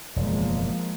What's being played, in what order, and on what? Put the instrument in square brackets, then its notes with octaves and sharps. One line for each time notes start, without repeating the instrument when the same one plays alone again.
[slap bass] E1 F#2 C#3 [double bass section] F3 G#3 A#3